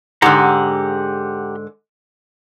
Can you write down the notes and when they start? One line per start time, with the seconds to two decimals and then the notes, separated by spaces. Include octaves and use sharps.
0.22 G#2 D3 G4 F#5 A#5